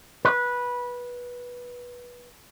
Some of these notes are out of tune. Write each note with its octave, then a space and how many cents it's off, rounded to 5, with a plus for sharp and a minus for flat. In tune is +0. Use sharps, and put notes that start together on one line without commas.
B4 -15